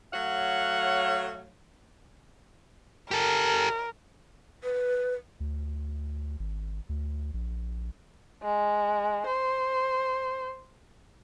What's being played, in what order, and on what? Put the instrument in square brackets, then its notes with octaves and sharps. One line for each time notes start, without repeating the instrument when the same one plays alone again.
[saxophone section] F#3 A3 C#5 F5 F#5
[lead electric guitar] G4 A4 [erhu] A#4
[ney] B4
[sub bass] D2
G#1
D2
A#1
[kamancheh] G#3
C5